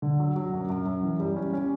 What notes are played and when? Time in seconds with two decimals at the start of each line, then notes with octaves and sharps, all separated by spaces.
0.02 D3
0.20 F#3
0.36 F#3
0.53 F#2
0.70 F#2
0.86 F#2
1.03 E3
1.20 G3
1.36 C#4
1.53 C#4